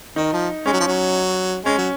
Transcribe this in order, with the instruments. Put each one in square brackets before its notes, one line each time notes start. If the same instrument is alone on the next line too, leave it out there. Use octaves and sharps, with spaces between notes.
[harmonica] D#3 [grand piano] D#4
[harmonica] F3
[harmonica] G#3 [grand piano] C#4
[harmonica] F#3
F3
F#3
[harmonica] G#3 [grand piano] C#4
[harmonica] F#3